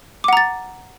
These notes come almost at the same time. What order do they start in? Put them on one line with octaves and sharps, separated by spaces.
D6 F#5 A#5 A6